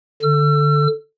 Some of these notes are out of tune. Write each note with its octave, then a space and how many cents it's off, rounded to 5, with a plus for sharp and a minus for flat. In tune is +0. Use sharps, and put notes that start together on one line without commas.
D3 +0 E6 +35